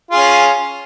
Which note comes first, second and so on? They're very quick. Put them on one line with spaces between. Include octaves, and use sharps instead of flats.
F4 G#4 C#4